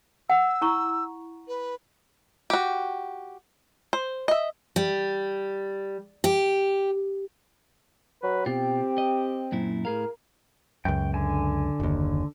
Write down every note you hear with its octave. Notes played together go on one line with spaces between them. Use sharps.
F#5 E6
E4 A#5 C#6
B4
F#4 G4
C5
D#5 E5
G3
G4
F#3 B4
B2 C4 F4 G4
D#5
F#2 A#2 E4
A2 G#4 A#4 F5
C#2 F#2 G5
D3 G#5
F#1 D#2